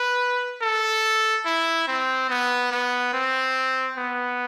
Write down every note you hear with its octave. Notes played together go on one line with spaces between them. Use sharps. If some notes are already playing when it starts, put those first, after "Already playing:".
Already playing: B4
A4
E4
C4
B3
B3
C4
B3